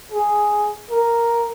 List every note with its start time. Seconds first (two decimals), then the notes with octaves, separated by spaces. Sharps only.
0.12 G#4
0.91 A#4